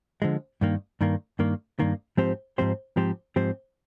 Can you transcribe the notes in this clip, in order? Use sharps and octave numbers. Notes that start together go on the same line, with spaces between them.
D3 F3 G#3
G2 D#3 A#3
G2 D#3 A#3
G2 D#3 A#3
G2 D#3 A#3
G#2 F3 C4 G4 C5
G#2 F3 C4 G4 C5
G#2 F3 C4 G4 C5
G#2 F3 C4 G4 C5